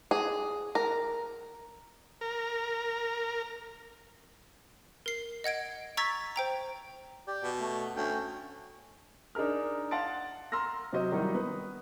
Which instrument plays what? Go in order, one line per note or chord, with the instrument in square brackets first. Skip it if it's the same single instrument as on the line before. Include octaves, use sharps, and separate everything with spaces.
[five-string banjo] G#4
A#4
[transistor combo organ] A#4
[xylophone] A#4 C7
D#5 F#5 G#6 D7
A#5 C#6 E6 G#6 A6 B6
C5 G5 A#5
[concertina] G4 D5 G5
[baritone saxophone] B2
[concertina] A3
[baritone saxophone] D2 [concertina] A3 C#4 G5
[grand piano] D4 D#4 G#4 A#4 F6
F5 F#5 A5 C6 A6 D7
A#5 C6 E6 F6 A#6
C3 F#3 F#4 C5 D#5
D#3 F#3 G3 D#4 E4
B3 B4